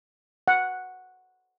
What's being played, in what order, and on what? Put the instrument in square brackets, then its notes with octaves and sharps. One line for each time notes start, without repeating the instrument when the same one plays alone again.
[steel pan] F#5